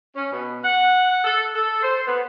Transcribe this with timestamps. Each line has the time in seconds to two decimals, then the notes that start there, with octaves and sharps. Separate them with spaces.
0.15 C#4
0.32 B2
0.63 F#5
1.24 A4
1.55 A4
1.83 C5
2.07 B3